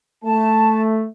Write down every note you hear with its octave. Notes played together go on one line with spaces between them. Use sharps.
A3 A5